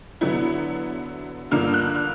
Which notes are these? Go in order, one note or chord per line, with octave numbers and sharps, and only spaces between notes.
D3 F#3 B3 E4
G2 D3 F3 A#3 D#4 F6
F#6
F6